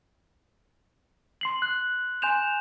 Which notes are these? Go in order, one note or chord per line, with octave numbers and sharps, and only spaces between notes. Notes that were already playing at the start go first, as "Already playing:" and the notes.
C6 C7 F#7
F#6
G#5 C6 G6 E7 F7